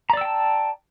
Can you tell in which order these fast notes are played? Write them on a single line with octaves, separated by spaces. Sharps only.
A#5 D5 E6 G5 A5